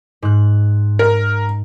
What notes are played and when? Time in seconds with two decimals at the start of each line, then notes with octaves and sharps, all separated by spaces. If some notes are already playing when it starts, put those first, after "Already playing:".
0.22 G#2 F#6
0.99 A#4